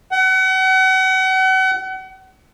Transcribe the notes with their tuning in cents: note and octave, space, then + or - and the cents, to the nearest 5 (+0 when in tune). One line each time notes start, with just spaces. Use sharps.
F#5 +35